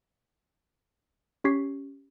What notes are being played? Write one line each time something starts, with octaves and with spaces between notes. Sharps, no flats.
C#4 G4 C#6 G#6 B6 C7